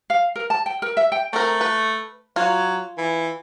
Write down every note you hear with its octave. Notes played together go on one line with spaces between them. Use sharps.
F5
A#4
A5
G5
A#4
E5
G5
A3 C4 A#4
B4
F#3 F4
E3